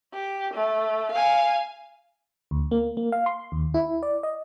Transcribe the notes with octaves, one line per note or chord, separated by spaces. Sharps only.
G4
A3
F5 G#5
D2
A#3
A#3
F5
C6
D#2
E4
D5
D#5